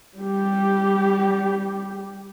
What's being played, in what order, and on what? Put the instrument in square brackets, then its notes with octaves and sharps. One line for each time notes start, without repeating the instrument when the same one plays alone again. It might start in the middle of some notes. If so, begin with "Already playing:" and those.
[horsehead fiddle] G3 G4